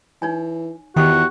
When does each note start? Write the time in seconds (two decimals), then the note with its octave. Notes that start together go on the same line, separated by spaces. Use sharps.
0.22 E3 D#4 C#5 G#5
0.96 E2 D#3 F#4 G4 G5 C#6